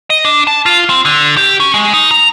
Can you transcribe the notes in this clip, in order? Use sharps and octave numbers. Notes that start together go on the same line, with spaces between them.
D#5
D4
A5
F4
C4
D3
G4
C#4
G#3
D#4
A#5